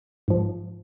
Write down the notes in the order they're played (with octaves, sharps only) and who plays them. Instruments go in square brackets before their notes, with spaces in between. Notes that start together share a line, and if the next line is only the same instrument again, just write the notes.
[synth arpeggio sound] G#2 F3